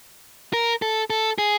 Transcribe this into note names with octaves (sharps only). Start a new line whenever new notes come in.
A#4
A4
A4
G#4